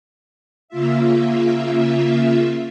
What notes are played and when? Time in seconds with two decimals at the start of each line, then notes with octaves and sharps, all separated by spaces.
0.68 C#3 A#3 F4 E5